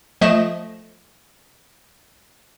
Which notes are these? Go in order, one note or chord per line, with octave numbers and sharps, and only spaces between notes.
F3 A3 D#5 E7